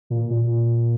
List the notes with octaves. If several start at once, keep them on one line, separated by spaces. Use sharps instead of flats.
A#2
A#2